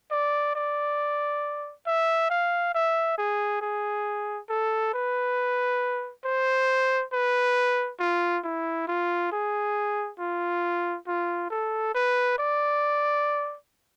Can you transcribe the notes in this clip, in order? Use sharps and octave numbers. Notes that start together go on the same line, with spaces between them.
D5
D5
E5
F5
E5
G#4
G#4
A4
B4
C5
B4
F4
E4
F4
G#4
F4
F4
A4
B4
D5